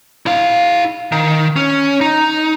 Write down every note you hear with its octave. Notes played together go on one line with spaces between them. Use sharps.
E4 F5
D#3
C#4
D#4